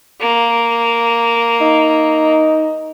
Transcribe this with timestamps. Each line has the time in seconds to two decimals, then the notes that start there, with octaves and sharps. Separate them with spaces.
0.20 A#3
1.61 D#4